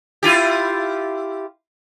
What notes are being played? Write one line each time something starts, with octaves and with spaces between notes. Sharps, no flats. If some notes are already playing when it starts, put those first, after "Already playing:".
E4 F4 G4